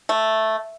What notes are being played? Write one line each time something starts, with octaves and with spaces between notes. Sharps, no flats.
A3